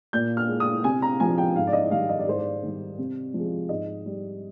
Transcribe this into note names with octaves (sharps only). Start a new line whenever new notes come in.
A#2 G6
F6
G#3
D#6
C3 G#5
A#5
F3 G#3 G#5
G5
G#2 F5
D5
D#5
D#3 G3 F5
D#5
D5
G#2 C5
D5
D#3 G3
C3
F3 G#3
G#2 D#5
G3